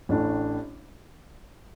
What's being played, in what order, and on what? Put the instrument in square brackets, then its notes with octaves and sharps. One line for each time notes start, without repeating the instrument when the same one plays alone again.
[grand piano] A1 A2 A3 D4